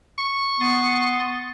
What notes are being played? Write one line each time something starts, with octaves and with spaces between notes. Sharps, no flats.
C#6
B3 C6 D#6 A6